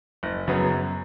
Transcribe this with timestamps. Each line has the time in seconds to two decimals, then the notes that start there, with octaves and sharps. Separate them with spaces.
0.23 F#1
0.48 F#2 C#3 F#3 B3
0.70 F#2